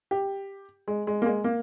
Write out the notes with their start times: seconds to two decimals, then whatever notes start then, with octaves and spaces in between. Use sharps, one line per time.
0.11 G4
0.88 G#3
1.07 G#3
1.22 A#3
1.26 G#3
1.44 A#3